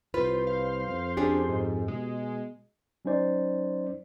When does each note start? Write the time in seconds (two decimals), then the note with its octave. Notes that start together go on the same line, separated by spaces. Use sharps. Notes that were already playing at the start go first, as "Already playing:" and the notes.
0.14 C2 F4 B4 C5
0.47 F5
0.87 F2
1.17 C#4 D4 G4 G#4
1.49 G#2
1.88 B2 G#3
3.05 F#3 C#4 D#4 C5 D5